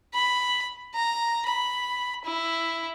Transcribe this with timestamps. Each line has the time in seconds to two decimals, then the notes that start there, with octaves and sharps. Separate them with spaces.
0.14 B5
0.94 A#5
1.46 B5
2.25 E4